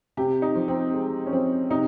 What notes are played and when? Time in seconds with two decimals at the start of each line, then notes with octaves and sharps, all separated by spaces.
0.17 C3 G4
0.42 D#4
0.55 F3
0.68 C4
0.94 G#3
1.26 C#4
1.32 F3 C4
1.70 C3 D#4